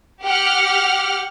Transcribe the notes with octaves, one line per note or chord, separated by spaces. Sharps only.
G4 F#5 F6